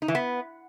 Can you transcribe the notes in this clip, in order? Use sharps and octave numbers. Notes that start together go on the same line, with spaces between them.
D#4
E3
B3